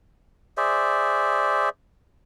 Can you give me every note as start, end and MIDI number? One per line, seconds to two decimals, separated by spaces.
0.57 1.69 68
0.57 1.69 72
0.57 1.69 74
0.57 1.69 76